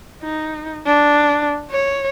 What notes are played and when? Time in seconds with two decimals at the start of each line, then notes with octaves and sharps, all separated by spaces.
0.24 D#4
0.87 D4
1.71 C#5